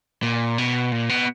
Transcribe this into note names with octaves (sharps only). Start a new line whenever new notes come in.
A#2
B2
A#2
B2